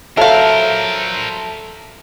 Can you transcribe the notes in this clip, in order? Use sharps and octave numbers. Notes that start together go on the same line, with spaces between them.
F#3 A4 A#4 C5 E5 F5